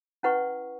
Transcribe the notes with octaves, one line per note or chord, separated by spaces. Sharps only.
C#4 E4 B4 F#5 C#6